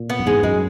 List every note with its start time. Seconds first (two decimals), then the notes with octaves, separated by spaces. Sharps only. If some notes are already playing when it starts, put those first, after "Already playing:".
Already playing: A#2
0.10 B3
0.19 F#2
0.26 E2 G#2 G#3
0.43 F#2 G#3